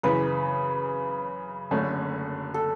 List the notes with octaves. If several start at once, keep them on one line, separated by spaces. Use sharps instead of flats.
F#2 C#3 E3 B4
F#1 F#2 D3 A3 C#4
A4